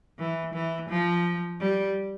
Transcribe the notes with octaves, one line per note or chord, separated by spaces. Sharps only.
E3
E3
F3
G3